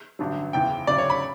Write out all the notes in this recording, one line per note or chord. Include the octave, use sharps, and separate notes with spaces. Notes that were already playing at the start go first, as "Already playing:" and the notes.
A1 G2 D3 F#3
F#1 E2 C#3 E3 G5
D2 C#3 F#3 D5
C#5
B5